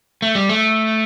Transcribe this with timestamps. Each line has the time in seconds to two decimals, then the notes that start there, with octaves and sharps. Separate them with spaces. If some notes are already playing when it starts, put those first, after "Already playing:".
0.22 A3
0.35 G3
0.49 A3